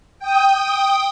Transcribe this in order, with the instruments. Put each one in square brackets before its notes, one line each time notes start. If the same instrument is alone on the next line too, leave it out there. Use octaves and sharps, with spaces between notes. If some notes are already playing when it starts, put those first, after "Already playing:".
[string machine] G5 D#6